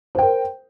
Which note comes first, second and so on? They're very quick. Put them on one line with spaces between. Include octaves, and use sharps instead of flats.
C5 G5 A#4